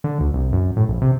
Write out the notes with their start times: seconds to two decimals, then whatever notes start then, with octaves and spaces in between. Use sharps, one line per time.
0.04 D3
0.20 D2
0.34 C2
0.53 F#2
0.77 A2
0.88 A#1
1.02 C3